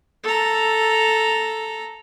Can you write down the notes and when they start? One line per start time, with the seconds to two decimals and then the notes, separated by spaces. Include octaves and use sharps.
0.24 A4 A#5